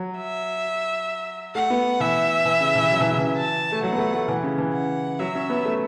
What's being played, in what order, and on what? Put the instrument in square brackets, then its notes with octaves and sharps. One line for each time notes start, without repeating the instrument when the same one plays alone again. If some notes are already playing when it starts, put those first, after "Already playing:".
Already playing: [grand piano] F#3
[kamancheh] E5
[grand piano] A3 [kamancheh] F#5
[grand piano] B3
[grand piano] E3 [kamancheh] E5
[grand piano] E3
C#3
E3
F#3
E3
C#3
E3
[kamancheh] A5
[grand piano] A3
[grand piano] F#3 [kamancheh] F#5
[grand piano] B3
A3
A3
E3
C#3
E3
[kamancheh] F#5
[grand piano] F#3 [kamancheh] E5
[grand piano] C#4
B3
A3